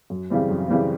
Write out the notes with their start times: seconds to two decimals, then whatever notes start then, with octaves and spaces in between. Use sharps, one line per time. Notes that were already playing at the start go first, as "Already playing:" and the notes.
0.10 F#2
0.30 C#3 E3 G3 C4
0.49 F#2
0.68 C#3 E3 G3 C4